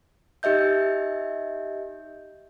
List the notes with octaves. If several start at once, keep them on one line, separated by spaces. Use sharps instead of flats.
D#4 G4 D#5 E5 G6